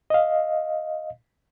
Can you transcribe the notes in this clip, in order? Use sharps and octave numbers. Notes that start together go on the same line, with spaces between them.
D#5 F5